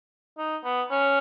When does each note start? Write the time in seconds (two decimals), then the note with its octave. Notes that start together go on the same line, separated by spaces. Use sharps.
0.38 D#4
0.64 B3
0.91 C#4